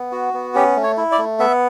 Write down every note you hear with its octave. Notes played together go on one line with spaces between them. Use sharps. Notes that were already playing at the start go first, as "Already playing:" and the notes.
Already playing: B3
F#4
B3
C#4 G4
A3
C#5
E4
D5
A3
B3 E5